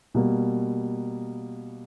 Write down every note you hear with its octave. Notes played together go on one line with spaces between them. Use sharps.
B2 G3 A#3